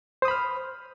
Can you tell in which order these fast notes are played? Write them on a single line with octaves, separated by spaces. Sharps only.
C5 D#6 B5 F6